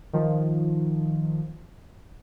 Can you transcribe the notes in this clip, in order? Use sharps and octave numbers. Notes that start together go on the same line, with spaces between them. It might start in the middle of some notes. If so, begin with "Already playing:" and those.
D#3 F3